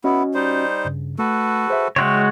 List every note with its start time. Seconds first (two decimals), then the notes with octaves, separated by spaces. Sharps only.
0.04 B3 C#4 E4 F#4 D#5
0.34 G3 D#4 C5
0.85 G2 C#3
1.19 A3 F#4 A4 B4
1.68 G#4 C5 E5
1.96 C#3 G#3 F#4 C#5 E5 G5 C6